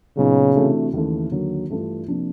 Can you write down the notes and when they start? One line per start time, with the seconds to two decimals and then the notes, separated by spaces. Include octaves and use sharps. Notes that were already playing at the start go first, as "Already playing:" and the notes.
0.17 A#2 C#3 F#3 B3 D#4 F#4
0.56 C3 E3 A3 D4 F#4
0.93 D#2 C#3 E3 A3
1.32 D#2 D3 F#3 A#3
1.70 G2 E3 A3 D4 F4
2.08 C3 F3 A#3 D4